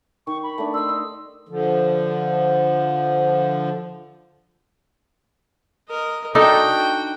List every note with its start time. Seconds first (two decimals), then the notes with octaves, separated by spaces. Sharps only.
0.27 D#3 C#6
0.43 B5
0.58 A3 D4
0.74 D#5 C6 E6
0.89 D#5
1.49 D3 F3
5.89 A#4 D#5
6.35 D4 D#4 F#4 A4 G5